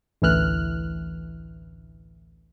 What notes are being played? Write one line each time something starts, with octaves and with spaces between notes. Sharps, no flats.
A1 D2 E3 F6 F#6